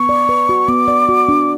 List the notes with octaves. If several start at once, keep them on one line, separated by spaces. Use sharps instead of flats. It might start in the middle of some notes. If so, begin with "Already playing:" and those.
Already playing: B3 C#6
D5
B4
F#4
B3 D6
D5
F#4
D4